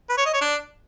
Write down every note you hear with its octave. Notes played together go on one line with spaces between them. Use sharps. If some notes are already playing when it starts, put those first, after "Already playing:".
B4
C#5
D#5
C#5
D4